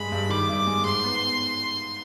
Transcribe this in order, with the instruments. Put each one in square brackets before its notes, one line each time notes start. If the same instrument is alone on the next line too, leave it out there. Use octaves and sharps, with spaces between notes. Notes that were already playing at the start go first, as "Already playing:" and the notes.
Already playing: [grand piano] G2 G#3 [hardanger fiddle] B5
[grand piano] G2
[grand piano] D#3 [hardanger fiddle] D6
[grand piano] G2
G#3
[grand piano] G#2 [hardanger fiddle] C6
[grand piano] B3